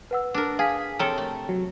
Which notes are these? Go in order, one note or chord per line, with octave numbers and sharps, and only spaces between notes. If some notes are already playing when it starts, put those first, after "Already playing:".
B4 F#5 E6
D4 A#4
G#4 F5 G#5 B6
C3 A4 A#4 C#5 G5 A#5
A3
F#3